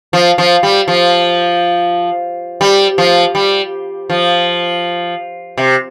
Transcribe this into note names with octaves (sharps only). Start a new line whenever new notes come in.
F3
F3
G3
F3
G3
F3
G3
F3
C3